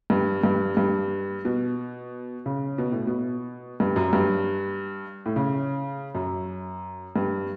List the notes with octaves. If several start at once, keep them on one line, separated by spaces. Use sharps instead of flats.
G2
G2
G2
B2
C#3
B2
A2
B2
G2
F#2
G2
A2
C#3
F#2
G2